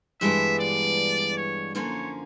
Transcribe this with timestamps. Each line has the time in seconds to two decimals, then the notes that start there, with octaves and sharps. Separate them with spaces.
0.21 G2 E3 G#3 B3 D4 E5
0.59 D5
1.36 C#5
1.75 F#2 D3 F3 A#3 C#4 C#5